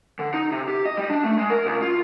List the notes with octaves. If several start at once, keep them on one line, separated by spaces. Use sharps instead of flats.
D3
D#4
C3
G4
D#5
G3
D4
A3
G#3
A#4
C#2
F4